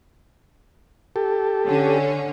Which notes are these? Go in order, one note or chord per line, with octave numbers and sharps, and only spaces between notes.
G4 A4
D3 C#4